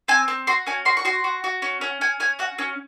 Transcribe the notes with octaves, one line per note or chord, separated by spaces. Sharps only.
C4 G#5
C4
F#4 C6
C#4 G#5
F#4 C6
C#6
F#4 C6
F#4
F#4
C#4
C#4
C#4 G#5
C#4 G#5
F#4 F#5
C#4